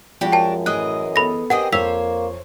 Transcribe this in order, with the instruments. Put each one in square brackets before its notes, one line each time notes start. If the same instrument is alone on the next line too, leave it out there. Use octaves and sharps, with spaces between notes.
[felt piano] F3 G#3 [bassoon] G3 [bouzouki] D4 F#4 G4
[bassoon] F#2 [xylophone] G5 A5
[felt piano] A2 [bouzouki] E3 G#4 D#5 [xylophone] F#6
[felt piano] B3 A4 [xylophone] B5 A#6
[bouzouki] C4 G#4 D#5 [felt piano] G4 A#4 B4 [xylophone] F#5
[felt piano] F2 [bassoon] A#3 [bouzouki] C5 C#5 [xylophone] E6 B6 F7